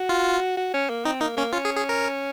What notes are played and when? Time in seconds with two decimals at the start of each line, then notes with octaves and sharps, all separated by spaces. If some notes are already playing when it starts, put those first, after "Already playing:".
Already playing: F#4
0.09 F4
0.57 F#4
0.74 C#4
0.90 A#3
1.05 C4 D#4
1.21 A#3 D#4
1.37 A#3 C#4
1.53 C#4 F4
1.65 G#4
1.77 G#4
1.89 A#4